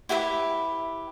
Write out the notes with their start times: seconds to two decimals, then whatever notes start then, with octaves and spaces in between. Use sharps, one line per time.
0.09 E4 G4 B4 E5